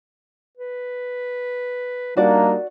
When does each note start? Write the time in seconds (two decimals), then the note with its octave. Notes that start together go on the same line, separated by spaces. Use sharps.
0.57 B4
2.17 G3 A#3 D4 D#4 F#4 D5